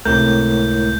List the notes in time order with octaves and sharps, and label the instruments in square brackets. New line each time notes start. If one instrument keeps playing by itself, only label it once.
[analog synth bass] C#2 [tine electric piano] A2 A#4 [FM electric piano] C3 A3 [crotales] G6